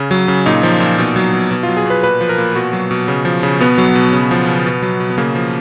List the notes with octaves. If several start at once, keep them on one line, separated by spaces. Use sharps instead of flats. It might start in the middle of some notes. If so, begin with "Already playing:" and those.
Already playing: C#3 C#4
F#3
C#3
A#2 D#4
F3
A#2
B2
F#3
B2
B2
F4
F#3
G#4
B2 B4
A#2 B4
F3
A#4
A#2
B2 F#4
F#3
B2
C#3
F3
C#3
B2 B3
F#3
B2
C#3
F3
C#3
B2
F#3
B2
B3
C#3 A#3
F3